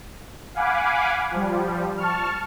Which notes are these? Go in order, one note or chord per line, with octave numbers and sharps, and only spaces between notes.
F5 F#5 G#5 B5 D6
F3 G3
A5 C#6 F6